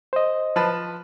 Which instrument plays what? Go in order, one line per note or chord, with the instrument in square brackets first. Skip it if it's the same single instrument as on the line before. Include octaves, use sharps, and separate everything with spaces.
[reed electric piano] C5 D#5
[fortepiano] F3 B4 A5